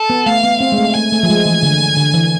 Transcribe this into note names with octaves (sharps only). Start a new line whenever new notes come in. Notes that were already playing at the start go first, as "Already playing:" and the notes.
Already playing: A4
B3
A3 F5
B3
C4 F5
G#3
A3
A3 G#5
A3
F3
G#3
E3
D3
D3
E3